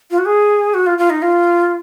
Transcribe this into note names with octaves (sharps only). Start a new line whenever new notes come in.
F4
F#4
G#4
F#4
F4
F4
D#4
F4